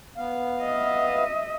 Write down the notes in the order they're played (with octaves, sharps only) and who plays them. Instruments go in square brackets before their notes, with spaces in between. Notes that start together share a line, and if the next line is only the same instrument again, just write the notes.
[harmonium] B3 F5
[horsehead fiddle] D#5 E5